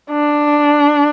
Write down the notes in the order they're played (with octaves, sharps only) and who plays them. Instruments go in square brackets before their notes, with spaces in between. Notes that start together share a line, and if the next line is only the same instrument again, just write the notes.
[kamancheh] D4